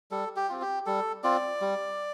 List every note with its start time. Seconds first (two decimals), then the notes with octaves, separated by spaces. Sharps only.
0.11 G3 A4
0.36 G4
0.49 C4 F4
0.62 G4
0.86 G3 A4
1.23 C4 F4 D5
1.61 G3